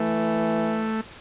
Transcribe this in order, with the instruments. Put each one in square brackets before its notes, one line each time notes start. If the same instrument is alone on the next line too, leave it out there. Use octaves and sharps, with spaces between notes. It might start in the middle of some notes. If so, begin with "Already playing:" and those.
Already playing: [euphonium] E3 [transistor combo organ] A3